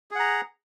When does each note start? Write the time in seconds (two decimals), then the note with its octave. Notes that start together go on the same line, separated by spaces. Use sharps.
0.11 G#4
0.15 F#5
0.19 A#5